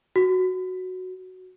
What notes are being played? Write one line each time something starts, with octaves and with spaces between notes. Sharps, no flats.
F#4